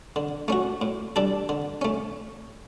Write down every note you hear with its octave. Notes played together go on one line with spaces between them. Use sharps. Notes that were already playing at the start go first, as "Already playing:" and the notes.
D3
A3 C#4 F#4
A2
G3 D4 A4
D3
A3 C#4